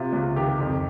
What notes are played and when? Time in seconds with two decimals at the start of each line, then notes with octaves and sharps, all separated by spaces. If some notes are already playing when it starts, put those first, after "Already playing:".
Already playing: C3 F4
0.13 C#2
0.36 D#3 G4
0.60 F2